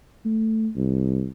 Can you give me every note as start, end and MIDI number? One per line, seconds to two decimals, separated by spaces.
0.25 0.69 57
0.76 1.27 36